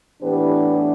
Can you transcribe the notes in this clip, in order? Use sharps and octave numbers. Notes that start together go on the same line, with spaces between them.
A2 E3 B3 D4 G4 B4